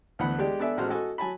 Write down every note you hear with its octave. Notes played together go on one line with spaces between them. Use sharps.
D2 E3 B3 F#5 B5
G#3 D4 G4 D5
B3 D4 A4 D5 E5 G#5
A1 G#3 F#4 A4 C5 F6
F#4 A4 D#5 G#5
F#3 G#5 A5 B5